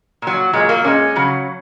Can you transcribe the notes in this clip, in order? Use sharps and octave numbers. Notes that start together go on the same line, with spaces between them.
A#2 F#3
A#2 F#3 G#3
A#3
A#2 G#3 C#4
C#3 F#3